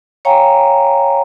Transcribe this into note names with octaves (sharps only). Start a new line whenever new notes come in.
C#5 F5 G5 G#5 A#5 C#6